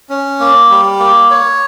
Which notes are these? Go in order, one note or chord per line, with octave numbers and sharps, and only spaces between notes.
C#4
A#3
G3
A#3
C#5